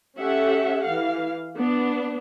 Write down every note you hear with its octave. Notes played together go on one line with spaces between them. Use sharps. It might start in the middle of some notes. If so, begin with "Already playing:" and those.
C#4 G4 A4 E5 F#5
E3 F5
B3 D4